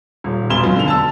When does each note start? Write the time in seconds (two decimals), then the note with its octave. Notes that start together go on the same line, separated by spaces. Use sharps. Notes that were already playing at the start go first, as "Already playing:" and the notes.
0.24 D#1
0.50 E1 B3 G#5 C6 E7 G7
0.63 D#3 F#3 F4
0.76 D3 F7
0.88 A5 E6